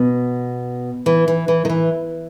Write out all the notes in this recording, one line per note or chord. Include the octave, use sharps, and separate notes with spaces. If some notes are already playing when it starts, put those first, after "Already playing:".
Already playing: B2
E3
E3
E3
D#3
E3